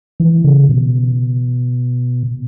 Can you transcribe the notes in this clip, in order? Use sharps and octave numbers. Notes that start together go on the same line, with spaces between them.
E3
C#3
B2